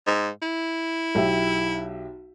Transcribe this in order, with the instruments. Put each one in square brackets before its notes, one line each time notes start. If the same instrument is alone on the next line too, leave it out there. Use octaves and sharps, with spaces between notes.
[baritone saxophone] G#2
E4
[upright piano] B1 G4 E5